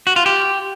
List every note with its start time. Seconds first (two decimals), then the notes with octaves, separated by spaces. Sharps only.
0.07 F#4
0.16 F4
0.26 G4